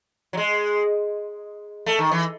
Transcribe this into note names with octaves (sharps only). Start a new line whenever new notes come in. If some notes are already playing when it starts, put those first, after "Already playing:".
F#3
G#3
A3
D#3
E3